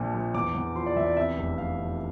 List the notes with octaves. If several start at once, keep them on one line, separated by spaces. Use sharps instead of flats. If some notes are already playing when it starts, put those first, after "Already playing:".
Already playing: A#1 A#2 F3
A#1
E2 D6
E2
F3 C6
D5
E2 E5
D5
C3 E5
F1
F1 F5
F2